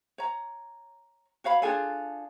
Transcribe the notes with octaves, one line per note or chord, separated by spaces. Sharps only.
C#5 A#5
F#4 C#5 F5 B5
D4 F4 G#4 A4